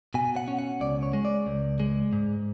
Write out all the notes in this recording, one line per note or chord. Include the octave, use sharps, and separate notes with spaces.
B2 G#5
F#5
C#4
F#5
C#2 D5
C#5
G#3
D5
C#2
G#3
G#2